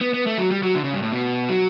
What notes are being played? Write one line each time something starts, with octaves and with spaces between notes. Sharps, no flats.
B3
B3
A3
F#3
G3
F#3
D3
C#3
G2
A2
B2
F#3